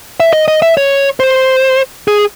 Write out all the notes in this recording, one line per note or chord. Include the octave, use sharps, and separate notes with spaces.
E5
D#5
D#5
E5
C#5
C5
G#4